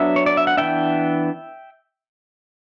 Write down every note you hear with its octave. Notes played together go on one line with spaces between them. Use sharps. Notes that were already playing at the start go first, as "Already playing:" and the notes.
Already playing: F#3 B3 D4 E5
C#5
D5
E5
F#5
E3 B3 D4 E5 G5